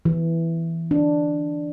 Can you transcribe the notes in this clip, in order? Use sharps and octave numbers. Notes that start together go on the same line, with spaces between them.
E3
D4